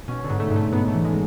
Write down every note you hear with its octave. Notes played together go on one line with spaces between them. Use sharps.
B2 C#4
D3
G#2
A3
G#2
A3
G#2 B3
A3
E3
G#3